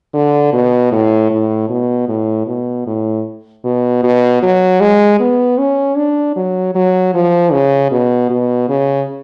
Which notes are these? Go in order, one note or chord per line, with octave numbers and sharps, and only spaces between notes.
D3
B2
A2
A2
B2
A2
B2
A2
B2
B2
F#3
G#3
B3
C#4
D4
F#3
F#3
F3
C#3
B2
B2
C#3